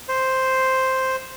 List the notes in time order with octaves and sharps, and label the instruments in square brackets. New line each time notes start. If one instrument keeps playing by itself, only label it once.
[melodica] C5